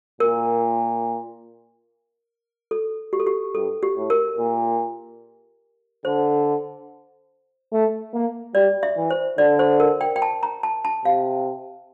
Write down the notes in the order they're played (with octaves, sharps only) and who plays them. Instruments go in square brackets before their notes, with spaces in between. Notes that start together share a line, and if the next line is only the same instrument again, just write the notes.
[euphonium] A#2 [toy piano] A#4
[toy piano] A4
G4
A4
G4
[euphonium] G2 [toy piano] A4
[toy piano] G4
[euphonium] A2
[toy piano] A#4
[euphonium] A#2
[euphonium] D3 [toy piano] C5
[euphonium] A3
A#3
[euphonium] G3 [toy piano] D5
[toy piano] E5
[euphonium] E3
[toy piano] C5
[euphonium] D3 [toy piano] D5
[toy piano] C5
A#4
G5
G5
A5
A#5
A5
A5
[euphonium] C3 [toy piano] F5